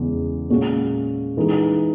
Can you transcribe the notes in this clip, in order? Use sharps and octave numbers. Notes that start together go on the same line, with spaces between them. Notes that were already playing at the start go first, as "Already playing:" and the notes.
Already playing: E2 C#3 G#3
A#2 G#3 C#4 F#4
E3 G#3 D#4